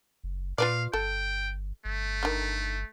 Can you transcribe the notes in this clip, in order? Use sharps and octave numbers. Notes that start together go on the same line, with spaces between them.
F#1
A#2 F4 B4 D5 F5
G1 A4 G5
G1 A3
D3 D#3